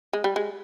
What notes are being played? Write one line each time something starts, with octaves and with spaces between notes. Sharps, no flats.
G#3
G3
G#3